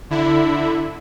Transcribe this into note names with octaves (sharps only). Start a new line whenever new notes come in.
D3 E4